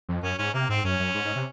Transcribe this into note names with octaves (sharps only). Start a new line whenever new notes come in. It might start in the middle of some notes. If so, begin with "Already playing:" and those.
F2
F#2 C#4
G#2 C#4
C3 A#3
G#2 C4
F#2 C#4
F#2
G#2
G#2
C3